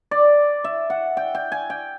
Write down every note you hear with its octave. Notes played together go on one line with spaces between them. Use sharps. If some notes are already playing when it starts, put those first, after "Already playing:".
D5
E5
F#5
G5
G5
G#5
G5